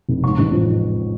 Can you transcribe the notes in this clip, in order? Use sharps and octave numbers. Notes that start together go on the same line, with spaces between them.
F1
G#2 C#6
A1
F3